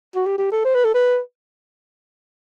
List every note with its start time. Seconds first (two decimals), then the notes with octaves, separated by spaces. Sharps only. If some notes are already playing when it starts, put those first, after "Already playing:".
0.16 F#4
0.26 G4
0.38 G4
0.52 A4
0.65 C5
0.75 B4
0.85 A4
0.94 B4